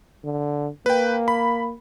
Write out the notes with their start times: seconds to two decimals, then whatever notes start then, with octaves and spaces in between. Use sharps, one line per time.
0.24 D3
0.86 A#3 B4 G5
1.28 B5